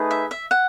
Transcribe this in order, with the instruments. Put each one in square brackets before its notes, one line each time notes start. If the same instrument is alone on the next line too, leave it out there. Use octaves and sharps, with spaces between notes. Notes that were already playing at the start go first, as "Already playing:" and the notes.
Already playing: [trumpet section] A3 D#4 G#4 B4
[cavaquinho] E5
E5
F#5